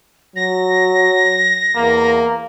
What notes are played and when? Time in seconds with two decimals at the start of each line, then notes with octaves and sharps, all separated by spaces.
0.36 F#3 A#6
1.76 E2 A#3